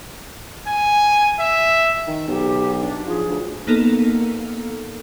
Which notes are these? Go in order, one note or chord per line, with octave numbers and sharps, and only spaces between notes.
G#5
E5
D#3
B1 G4
D4
F3 G#4
D2
A#3 B3 D#4 A4 A#4